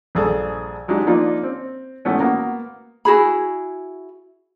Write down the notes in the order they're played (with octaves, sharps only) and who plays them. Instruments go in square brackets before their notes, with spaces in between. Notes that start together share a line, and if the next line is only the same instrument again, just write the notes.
[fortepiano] A#1 G2 G#4 A4 A5
F#3 G#3 D4 D#4 G4
F3 A#3 D4 D#4 F4
C4
G#2 E3 A3 B3 C#4
A#3 B3 F#4
[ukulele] E4 F#4 G#4 B5